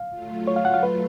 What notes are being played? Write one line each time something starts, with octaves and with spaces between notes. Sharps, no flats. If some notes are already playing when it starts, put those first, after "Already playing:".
Already playing: F5
F#3 A3 F4
C#5
F5
F#5
F5
B4